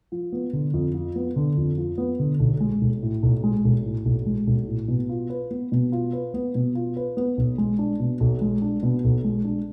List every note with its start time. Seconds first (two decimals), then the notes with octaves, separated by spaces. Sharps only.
0.12 F3
0.32 B3
0.53 D3
0.74 F2
0.94 F3
1.16 B3
1.36 D3
1.57 F2
1.78 F3
1.98 B3
2.19 D3
2.40 B1
2.60 G#3
2.81 B1
3.02 A2
3.23 B1
3.44 G#3
3.65 B1
3.85 A2
4.05 B1
4.26 G#3
4.47 B1
4.68 A2
4.88 B2
5.09 F4
5.30 B4
5.51 B3
5.72 B2
5.92 F4
6.13 B4
6.34 B3
6.55 B2
6.75 F4
6.97 B4
7.17 B3
7.37 B1
7.58 G#3
7.79 D4
8.00 B2
8.20 B1
8.41 G#3
8.62 D4
8.83 B2
9.04 B1
9.24 G#3
9.44 D4